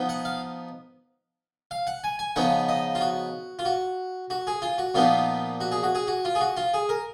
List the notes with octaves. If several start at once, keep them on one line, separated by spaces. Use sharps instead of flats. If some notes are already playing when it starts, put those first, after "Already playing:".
Already playing: F3 B3 D#4
F#5
F5
F5
F#5
G#5
G#5
C#3 F3 B3 D#4 F#5
D#5
F4
F#4
F4
F#4
F#4
G#4
F4
F#4
A#2 F3 B3 D#4 F4
F#4
G#4
F#4
G#4
F#4
F4
G#4
F#4
F4
G#4
A#4